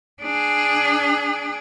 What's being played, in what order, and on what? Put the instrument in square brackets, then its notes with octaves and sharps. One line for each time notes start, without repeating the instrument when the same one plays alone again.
[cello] D4 G#4